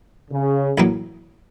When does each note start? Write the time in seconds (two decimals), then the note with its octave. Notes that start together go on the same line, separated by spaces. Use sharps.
0.31 C#3
0.78 A1 A2 F#3 A#3